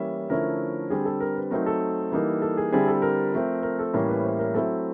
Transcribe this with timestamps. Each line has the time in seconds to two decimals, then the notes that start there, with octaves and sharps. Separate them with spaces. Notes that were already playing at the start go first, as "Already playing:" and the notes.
Already playing: E3 G3 A#3 C#4 E4 E5
0.30 D3 F3 A3 C#4 E4 A#4
0.90 D3 G3 C4 G#4
1.05 A4
1.20 A#4
1.36 B4
1.51 F#3 A3 C4 D#4 A#4
1.66 A4
2.12 E3 G3 A#3 D#4
2.42 A4
2.57 G#4
2.72 D3 G3 C4 E4 G#4
2.88 A4
3.02 A#4
3.33 F3 A3 C4
3.63 A#4
3.79 A4
3.93 A2 E3 G3 A#3 C#4 A#4
4.09 B4
4.24 C5
4.39 A#4
4.54 F#3 A3 C4 E4 A4